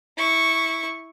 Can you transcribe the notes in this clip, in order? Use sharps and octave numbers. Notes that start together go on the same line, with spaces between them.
E4 C#6